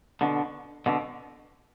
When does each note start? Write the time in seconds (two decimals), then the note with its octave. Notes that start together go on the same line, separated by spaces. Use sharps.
0.21 B2 D3
0.86 B2 D3